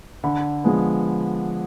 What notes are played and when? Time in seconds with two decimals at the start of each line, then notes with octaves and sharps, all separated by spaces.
0.24 D3 B5
0.64 F3 G#3 B3